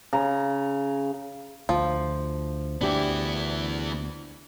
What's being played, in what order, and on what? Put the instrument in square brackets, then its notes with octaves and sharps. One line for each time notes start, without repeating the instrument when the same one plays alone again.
[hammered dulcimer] C#3 A#5
[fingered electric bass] D2 [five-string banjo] F3
[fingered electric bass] D2 [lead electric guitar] B3 E4 [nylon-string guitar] D4 G4